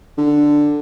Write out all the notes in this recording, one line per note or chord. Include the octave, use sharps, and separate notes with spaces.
D3